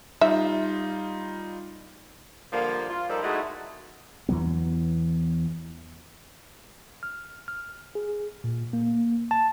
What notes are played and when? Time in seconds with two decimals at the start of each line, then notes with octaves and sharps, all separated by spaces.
0.21 G3 D#4 F4 E5
2.52 D3 F3 G3 A#3
2.90 F4
3.09 F3 G3 D#4 A4 A#4
3.23 G#3 A3 D#4 E4 F#4 G#4
4.29 E2 E3 F#3 B3
7.03 F6
7.48 F6
7.95 G#4
8.44 A#2
8.73 A#3
9.31 A5